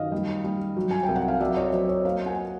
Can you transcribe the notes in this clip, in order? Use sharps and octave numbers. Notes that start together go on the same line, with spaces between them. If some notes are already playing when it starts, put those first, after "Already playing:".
Already playing: F#2 D#3 D#5 F5
G3
G3
F#3
G#5
C2 G5
F#5
F5
F#3 D5 E5
C#5 D#5
F#3 C5 D5
C#5 D#5
A#3 D#5 F5
F#5 G#5